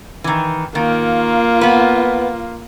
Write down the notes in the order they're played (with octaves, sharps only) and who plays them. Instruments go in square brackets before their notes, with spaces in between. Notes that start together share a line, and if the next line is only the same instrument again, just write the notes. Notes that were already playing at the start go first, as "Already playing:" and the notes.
[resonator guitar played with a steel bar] D#3 E3
[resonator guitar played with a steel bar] D#3 [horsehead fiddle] A#3 F4
[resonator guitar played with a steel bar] B3 B4